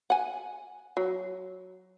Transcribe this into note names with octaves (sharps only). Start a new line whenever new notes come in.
F#5 G#5
F#3